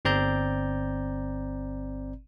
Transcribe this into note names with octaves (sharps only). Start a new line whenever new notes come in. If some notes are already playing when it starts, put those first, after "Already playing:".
G1 C4 D5 A#5 G6